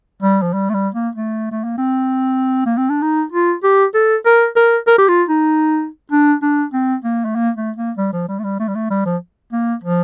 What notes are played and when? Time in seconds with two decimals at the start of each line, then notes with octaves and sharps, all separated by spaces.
0.22 G3
0.42 F3
0.53 G3
0.70 A3
0.74 G3
0.94 A#3
1.15 A3
1.51 A3
1.64 A#3
1.78 C4
2.66 A#3
2.77 C4
2.90 D4
3.02 D#4
3.32 F4
3.63 G4
3.94 A4
4.25 A#4
4.56 A#4
4.87 A#4
4.98 G4
5.08 F4
5.29 D#4
6.12 D4
6.42 D4
6.73 C4
7.04 A#3
7.25 A3
7.35 A#3
7.56 A3
7.77 A#3
7.97 G3
8.13 F3
8.28 G3
8.39 A3
8.44 G3
8.59 A3
8.68 G3
8.75 A3
8.90 G3
9.06 F3
9.52 A#3
9.84 F3